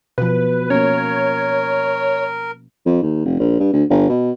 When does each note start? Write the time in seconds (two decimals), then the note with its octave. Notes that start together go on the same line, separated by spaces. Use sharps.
0.18 B2 F3 B4
0.70 A#3 C#4 A#4 C#5
2.86 F2
3.02 D#2
3.25 F1
3.39 A#1
3.60 G2
3.73 D2
3.90 G1
4.09 B2